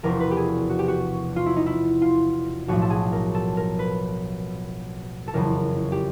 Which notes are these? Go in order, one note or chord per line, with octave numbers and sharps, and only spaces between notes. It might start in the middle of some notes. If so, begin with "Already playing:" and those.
E1 E2 C3 F3 A#4
B4
G4
G#4
F#4
G4
F#4
F4
E4
D#4
E4
F4
B1 A2 F3 F#4
A4
G#4
A#4
A4
A#4
B4
A4
F#1 F2 C#3 E3 A#4
G4